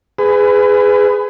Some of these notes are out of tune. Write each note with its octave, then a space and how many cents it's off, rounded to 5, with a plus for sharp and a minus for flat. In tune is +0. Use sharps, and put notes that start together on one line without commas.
G#4 +0 B4 +30